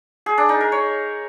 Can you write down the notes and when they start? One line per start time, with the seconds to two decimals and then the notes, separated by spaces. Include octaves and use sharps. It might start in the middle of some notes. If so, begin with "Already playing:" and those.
0.26 G#4
0.38 D4
0.49 D#4
0.61 A#4
0.72 C#5